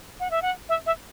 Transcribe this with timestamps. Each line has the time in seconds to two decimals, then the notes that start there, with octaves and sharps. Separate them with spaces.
0.20 F#5
0.31 E5
0.42 F#5
0.69 E5
0.86 E5